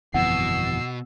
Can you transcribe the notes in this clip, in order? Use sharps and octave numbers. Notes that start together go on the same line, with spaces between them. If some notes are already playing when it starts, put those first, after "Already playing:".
G1 F2 B2 E3 F#5 E6 C7